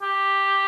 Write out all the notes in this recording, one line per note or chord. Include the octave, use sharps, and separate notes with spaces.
G4